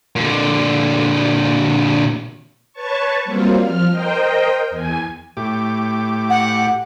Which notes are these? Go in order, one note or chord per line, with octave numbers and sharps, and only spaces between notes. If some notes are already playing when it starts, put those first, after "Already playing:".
A#2 D3
B4 C#5 A5 C#6
F#3 G3 A#3 C4 F4
F3 F6
A#4 C5 D#5 G5
E2 G#5
A2 G4 D6
F#5